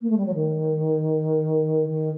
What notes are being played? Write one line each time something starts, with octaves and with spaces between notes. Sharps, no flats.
A#3
A3
G3
F#3
D#3
D#3